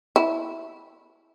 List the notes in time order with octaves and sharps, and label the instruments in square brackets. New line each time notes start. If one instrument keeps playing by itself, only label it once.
[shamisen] E4